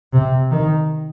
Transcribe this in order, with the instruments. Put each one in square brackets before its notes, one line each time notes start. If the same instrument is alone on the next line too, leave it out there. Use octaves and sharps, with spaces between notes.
[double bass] C3
D#3